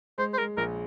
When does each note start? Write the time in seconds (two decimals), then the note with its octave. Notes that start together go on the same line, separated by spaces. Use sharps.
0.18 G#3 C5
0.33 C5
0.38 G#3 A#4
0.57 A#1 A#4